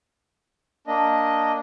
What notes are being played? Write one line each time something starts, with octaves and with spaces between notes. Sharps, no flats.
A#3 D4 D#5